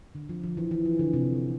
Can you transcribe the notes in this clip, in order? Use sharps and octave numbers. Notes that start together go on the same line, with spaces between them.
D3
F3
F3
E3
E3
F3
D3
C3